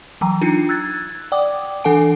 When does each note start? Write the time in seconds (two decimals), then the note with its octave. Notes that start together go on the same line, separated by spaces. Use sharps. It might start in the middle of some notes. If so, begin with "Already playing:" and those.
0.21 E3 F#3 G5 A#5
0.41 D4 D#4 F4
0.69 E6 F#6 G#6 A6
1.32 D5 F#5 G5 D6 D#6
1.84 E3 D4 A4 F#5 G#5 D7